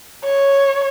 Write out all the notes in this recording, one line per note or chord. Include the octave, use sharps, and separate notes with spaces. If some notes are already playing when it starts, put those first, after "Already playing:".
C#5